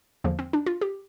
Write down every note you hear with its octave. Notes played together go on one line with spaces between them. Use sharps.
E2 D3 F3 A#3
C4
D4
F4
G4